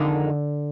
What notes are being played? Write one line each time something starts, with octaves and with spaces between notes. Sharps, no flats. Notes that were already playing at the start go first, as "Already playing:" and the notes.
Already playing: F2 D3 D#3 G#3 D#4